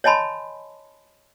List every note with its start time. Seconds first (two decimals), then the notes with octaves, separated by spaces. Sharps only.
0.04 C#5 D#5 G#5 A5 B5 C6